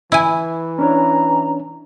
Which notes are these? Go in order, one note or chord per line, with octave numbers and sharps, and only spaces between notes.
E3 E4 G#5
C#4 D4 C#5 A#5